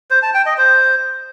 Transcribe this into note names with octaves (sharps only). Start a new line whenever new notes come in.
C5
A5
G5
D#5
C5